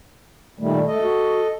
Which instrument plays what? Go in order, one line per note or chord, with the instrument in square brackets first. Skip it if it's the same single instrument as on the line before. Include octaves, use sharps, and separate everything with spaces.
[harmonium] A#2 D#3 G3 [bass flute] A3
[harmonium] A4 D#5
[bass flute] F#4